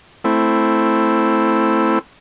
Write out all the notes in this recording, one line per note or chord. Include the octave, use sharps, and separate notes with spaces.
A3 C4 E4